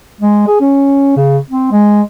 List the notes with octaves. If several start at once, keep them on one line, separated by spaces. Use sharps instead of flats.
G#3
G#4
C#4
C#3
C4
G#3